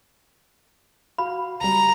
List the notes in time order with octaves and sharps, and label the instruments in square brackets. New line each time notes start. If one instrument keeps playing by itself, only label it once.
[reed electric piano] F#4 F5 [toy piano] B5
[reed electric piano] C#2 G3 [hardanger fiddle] A#5